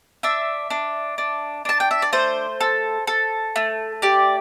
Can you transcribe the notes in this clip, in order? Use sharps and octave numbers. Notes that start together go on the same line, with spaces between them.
D4 E5
D4
D4
D4 A5
G5
E5
D5
A3 C5
A4
A4
A3
G4 D5